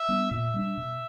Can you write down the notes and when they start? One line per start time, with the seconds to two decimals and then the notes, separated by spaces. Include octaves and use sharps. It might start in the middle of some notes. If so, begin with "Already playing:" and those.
Already playing: E5
0.08 G3 B3 D4
0.31 A#2 E5
0.54 G3 B3 D4
0.77 B2